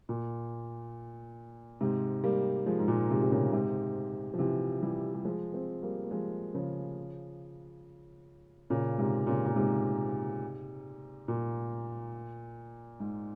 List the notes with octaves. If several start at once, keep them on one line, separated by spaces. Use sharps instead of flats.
A#2
G#2 C3
G3 A#3
F3 G#3
G#2
A#2
G#2 C3
C3
A#2 C#3
G#2 C3
F3
C3 E3
E3 G3
G3
F3 G#3
G#3 C4
G3 A#3
A#3
F3 G#3
C#3 F3
A#2 C#3
G#2 C3
A#2 C#3
A#2
G#2 C3
A#2
G#2